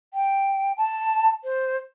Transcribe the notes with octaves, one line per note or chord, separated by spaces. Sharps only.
G5
A5
C5